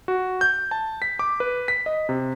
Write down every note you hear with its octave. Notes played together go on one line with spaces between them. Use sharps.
F#4
G6
A5
B6
D6
B4
B6
D#5
C3